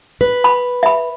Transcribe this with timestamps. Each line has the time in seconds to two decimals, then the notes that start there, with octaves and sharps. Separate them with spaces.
0.21 B4
0.44 B5
0.83 E5 B5